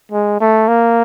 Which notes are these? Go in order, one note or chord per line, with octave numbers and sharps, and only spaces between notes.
G#3
A3
A#3